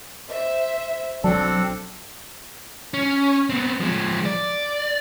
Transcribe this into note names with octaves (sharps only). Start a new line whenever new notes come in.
C5 E5
B1 F#3 C4 D4 A4 D5 A5
C#4
B3 C4
F3 G#3
D5